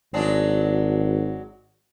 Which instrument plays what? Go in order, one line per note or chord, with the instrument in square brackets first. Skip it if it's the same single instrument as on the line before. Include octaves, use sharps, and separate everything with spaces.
[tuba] G#1 [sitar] F#3 G#3 D4